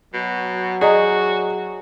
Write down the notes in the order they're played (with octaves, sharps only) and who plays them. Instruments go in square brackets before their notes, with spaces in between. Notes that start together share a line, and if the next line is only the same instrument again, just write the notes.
[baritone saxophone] B2 [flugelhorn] F#3
[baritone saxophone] F#4 [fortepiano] G#4 [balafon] D5 D#5 A#5